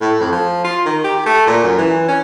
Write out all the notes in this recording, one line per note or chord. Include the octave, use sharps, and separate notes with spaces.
A2
F2
F3
F4
D#3
G4
A3
A#2
F#2
E3
C#4